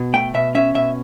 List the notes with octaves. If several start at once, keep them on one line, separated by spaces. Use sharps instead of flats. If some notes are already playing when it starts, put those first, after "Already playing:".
Already playing: B2
A3 G5
B2 E5
C#4 E5
B2 E5